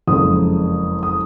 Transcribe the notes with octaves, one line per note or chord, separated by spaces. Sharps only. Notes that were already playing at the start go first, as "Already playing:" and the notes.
F#1 F2 C#3 G#3 D#6
D#6